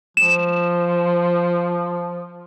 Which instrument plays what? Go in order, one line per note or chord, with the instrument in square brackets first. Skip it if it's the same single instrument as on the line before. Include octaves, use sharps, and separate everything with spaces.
[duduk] F3 [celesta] E7